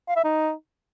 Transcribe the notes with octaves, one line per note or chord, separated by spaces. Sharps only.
F5
E5
D#4